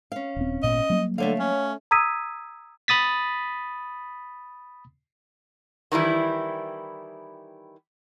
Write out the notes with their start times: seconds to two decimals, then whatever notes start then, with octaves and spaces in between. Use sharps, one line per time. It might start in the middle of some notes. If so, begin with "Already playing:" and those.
0.12 C#4 F5
0.36 D#1 C4
0.63 G#1 A#2 B3 D#5
0.90 F#3 G3 A#3
1.18 D3 A3 C#5 F5
1.39 C#4
1.91 A#5 D#6 E6 G#6 B6 D#7
2.88 B5 D#6 A6 B6
5.92 D#3 E3 G3 E4